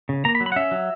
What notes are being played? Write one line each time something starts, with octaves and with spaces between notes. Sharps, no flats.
C#3
A#3 A#5
B5
F#3
B5
F#5
C#4 E5
F#3